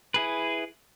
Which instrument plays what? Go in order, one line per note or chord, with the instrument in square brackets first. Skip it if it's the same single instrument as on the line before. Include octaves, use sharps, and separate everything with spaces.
[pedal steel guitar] E4 G#4 B4